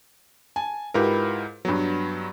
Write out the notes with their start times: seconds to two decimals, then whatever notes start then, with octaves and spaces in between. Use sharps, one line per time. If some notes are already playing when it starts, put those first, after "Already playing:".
0.56 G#5 A5
0.94 G#2 E4 F4 G4 A#4 B4
1.65 G2 F#3 B3